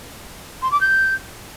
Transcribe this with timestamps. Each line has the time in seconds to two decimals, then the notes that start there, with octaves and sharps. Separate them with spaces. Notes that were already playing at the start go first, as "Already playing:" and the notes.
0.62 C6
0.72 D6
0.81 G6